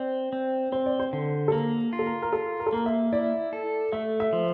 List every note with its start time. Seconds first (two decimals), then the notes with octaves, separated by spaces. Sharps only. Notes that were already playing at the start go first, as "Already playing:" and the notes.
Already playing: C4 D5
0.33 C4
0.72 C4 C5
0.86 D5
0.99 C5
1.13 D3
1.48 A4
1.52 A#3 A#4
1.93 F4
1.99 A4
2.06 A#4
2.22 A#4
2.32 F4 A4
2.60 A#4
2.66 A4
2.73 A#3 A#4
2.86 E5
3.12 E4 D5
3.53 A4
3.92 A3 E5
4.20 E5
4.33 F3